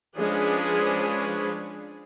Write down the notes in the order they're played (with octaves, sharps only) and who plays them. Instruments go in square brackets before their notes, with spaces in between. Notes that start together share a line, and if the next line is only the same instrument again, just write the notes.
[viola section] F3 G#3 C#4 D4 G#4 B4